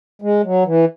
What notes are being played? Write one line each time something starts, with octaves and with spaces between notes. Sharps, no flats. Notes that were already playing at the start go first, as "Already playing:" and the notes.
G#3
F#3
E3